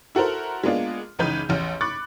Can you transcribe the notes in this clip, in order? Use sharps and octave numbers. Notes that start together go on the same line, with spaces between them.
E4 F#4 A4 A#4 C5
G#3 A#3 B3 D4 F4
F#1 C#2 E3 D#4 B4 G6
A1 E2
B5 C#6 D6 F#6 A6 C#7